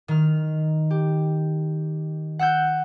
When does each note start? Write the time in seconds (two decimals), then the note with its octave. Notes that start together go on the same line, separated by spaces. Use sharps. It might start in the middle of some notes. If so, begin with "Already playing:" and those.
0.08 D#3 F6
0.91 G4
2.39 F#5 E6 F#6 G6